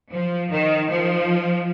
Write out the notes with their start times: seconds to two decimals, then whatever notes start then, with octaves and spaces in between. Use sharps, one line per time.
0.12 F3
0.50 D#3
0.89 F3